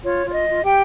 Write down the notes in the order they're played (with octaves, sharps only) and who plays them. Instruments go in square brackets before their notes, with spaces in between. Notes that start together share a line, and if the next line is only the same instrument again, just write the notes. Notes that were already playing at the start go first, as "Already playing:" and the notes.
[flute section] F4 C#5
F4 C#5
D#5
F4
G4 G5